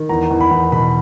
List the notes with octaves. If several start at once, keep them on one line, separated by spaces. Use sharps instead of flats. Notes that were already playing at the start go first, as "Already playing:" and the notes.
Already playing: D#3
E2 A#5
E2
B5
E2
B2 B5